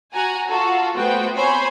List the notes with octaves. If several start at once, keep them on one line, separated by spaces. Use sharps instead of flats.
F#4 F#5 G#5 A#5
F4 F#4 A4
A3 B3 F#4 B4 C5 G5
C4 C5 C#5 G#5 B5 C6